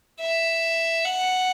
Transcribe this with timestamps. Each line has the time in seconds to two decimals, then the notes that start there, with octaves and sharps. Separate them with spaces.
0.21 E5
1.05 F#5